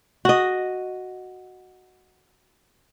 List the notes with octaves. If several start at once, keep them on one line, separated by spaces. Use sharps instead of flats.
F#4 D#5